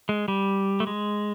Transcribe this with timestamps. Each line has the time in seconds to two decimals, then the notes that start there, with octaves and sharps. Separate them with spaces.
0.09 G#3
0.28 G3
0.80 A3
0.87 G#3